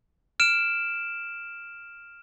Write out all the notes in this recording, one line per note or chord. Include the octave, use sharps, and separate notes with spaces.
F6 D7 E7